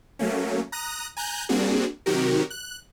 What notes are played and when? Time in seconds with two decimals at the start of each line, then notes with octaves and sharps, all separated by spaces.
0.19 F#3 A3 A#3 C#4
0.72 A#5 D#6 F#6 A#6
1.17 G#5 A#5 F#6 G6
1.49 G3 A#3 C4 D4 F#4 G#4
2.06 C3 D#3 F#3 F#4 G4 A#4
2.50 F#6